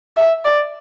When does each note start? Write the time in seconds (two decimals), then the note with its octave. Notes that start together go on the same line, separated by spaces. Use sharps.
0.17 E5
0.45 D5